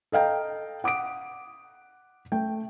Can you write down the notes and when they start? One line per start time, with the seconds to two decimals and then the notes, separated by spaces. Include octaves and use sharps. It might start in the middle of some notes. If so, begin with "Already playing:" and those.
0.12 A4 D#5 F5 G5 A#5
0.84 F#5 D6 D#6 D7
2.32 A3 G5